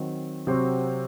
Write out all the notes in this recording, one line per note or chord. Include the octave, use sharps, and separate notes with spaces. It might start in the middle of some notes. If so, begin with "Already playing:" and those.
Already playing: D#3 F#3 C4
C3 F#3 C4 F#4